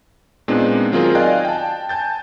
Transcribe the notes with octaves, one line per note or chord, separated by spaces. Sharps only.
A#2 G#3 B3 C4 D4 D#4
D#3 F#3 C4 F4 G#4 A#4
D5 D#5 F5 G5 G#5 F#6
G5 A5
G#5 A5 G6 A6